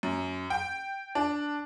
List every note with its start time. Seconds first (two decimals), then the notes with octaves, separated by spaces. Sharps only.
0.03 F#2
0.50 G5
1.15 D4